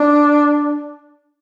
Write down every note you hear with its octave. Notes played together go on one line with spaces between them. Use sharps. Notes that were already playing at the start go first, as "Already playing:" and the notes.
Already playing: D4